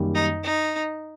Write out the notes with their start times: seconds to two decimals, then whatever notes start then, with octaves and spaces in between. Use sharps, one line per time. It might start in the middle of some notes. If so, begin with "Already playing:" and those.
Already playing: F#2 D#3 G3 A#3
0.15 D#4
0.43 D#4